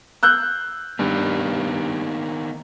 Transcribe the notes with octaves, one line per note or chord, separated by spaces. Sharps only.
E6 F#6 G6
G2 D#3 A#3 B3